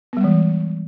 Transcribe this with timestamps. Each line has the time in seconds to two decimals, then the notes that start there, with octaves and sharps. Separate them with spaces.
0.13 B3
0.17 G3
0.20 G#3
0.24 E3